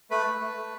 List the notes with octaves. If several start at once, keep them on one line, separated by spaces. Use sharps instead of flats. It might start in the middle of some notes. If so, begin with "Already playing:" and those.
A3 B4
A3
A3
A3